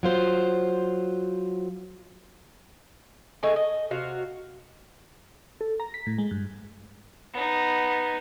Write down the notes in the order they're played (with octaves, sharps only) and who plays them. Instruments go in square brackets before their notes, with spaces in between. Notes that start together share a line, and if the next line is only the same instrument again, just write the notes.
[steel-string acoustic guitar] F#3 F4 C5
[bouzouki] A3 D#4 G#4
D#5
C3 F#4 F5
[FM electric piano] A4
A#5
B6
A2
G#3
G2
[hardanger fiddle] B3 D#4